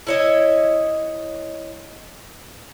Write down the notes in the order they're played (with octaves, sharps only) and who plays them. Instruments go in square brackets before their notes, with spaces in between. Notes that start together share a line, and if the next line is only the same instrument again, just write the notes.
[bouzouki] E4 C#5 D#5